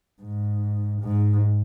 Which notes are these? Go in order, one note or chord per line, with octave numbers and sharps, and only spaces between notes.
G#2
G#2